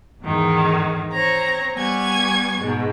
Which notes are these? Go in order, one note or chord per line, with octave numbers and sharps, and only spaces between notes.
E2 G#2 D#3
C4 C#5 A#5
G3 B3 G#5 C#6 G#6
G#2 B2